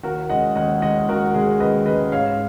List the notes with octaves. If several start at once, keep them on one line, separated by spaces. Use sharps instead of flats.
D#2 F#4 A#4
C#3 G#3 D#5 F#5
D#2 D#5 F#5
C#3 G#3 D#5 F#5
D#2 F#4 A#4
C#3 G#3 G#4
D#2 B4 D#5
C#3 G#3 B4 D#5
G#2 C#5 F5